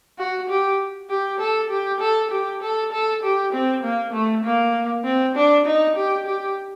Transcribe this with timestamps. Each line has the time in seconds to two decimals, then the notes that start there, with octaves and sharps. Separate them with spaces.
0.18 F#4
0.49 G4
1.09 G4
1.40 A4
1.70 G4
2.00 A4
2.31 G4
2.62 A4
2.92 A4
3.23 G4
3.53 C4
3.83 A#3
4.13 A3
4.44 A#3
5.04 C4
5.35 D4
5.66 D#4
5.96 G4
6.26 G4